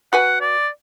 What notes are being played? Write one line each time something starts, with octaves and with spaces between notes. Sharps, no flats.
F#4 B4 F#5 G#5
D5